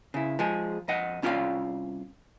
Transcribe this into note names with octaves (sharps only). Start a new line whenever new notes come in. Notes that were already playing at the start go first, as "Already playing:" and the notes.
C#3 E4
F3 G#3 G#4
F2 D#5 F#5
C2 C#4 F4 C#5 D5 F5